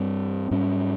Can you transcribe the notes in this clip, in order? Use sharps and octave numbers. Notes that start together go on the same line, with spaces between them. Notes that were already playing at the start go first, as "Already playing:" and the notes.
Already playing: G2 G3 C4
G#2 G3 C#4